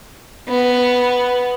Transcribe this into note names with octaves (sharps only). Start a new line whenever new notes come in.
B3